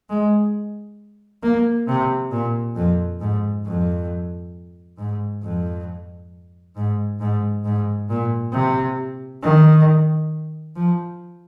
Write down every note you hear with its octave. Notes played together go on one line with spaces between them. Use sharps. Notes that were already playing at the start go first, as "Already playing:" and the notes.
G#3
A#3
C3
A#2
F2
G#2
F2
G#2
F2
G#2
G#2
G#2
A#2
C3
D#3
F3